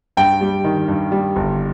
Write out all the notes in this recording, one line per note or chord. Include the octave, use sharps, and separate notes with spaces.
G2 G5
G3
D#3
G2
G3
G1